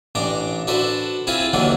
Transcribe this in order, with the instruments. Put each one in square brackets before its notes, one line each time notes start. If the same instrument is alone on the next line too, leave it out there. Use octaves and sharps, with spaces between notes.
[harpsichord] A1 D4 A#5 D6
D4 F#4 A4 B4 C5
C4 E4 F4 G#4 F5
D#2 D3 E3 F#3 D4 F#4